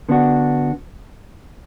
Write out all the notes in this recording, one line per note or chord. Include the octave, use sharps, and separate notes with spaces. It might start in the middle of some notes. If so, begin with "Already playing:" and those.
D3 B3 D4 F#4